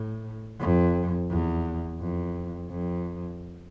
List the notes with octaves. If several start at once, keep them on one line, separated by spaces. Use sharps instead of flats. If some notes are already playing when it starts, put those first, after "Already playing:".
Already playing: A2
F2
E2
F2
F2